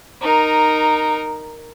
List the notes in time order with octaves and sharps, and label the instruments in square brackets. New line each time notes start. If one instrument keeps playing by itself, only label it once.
[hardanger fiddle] D#4 A#4